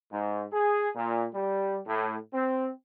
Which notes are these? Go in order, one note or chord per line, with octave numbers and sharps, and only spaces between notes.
G#2
G#4
A#2
G3
A2
C4